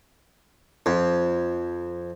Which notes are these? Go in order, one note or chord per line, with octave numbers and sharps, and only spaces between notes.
F2